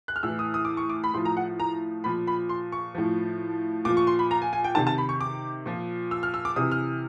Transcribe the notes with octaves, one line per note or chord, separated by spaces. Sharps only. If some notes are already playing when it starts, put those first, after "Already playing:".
F#6
F6
A2 E3 E6
D#6
D#6
D6
C#6
D6
B5
A2 F3 C6
A#5
F#5
A#5
A#2 F3 B5
B5
C6
C#6
A2 F3
A#2 F3 D6
C#6
C6
B5
A#5
G#5
G#5
G5
C3 D#3 A5
A5
B5
C#6
D6
A#2 F3
E6
F6
E6
D6
C3 E3 D#6
F6